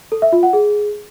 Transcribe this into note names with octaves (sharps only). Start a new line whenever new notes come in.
A4
E5
F4
F#5
G#4